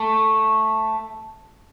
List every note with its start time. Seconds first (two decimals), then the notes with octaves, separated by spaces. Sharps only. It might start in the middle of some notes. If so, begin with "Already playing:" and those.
Already playing: A3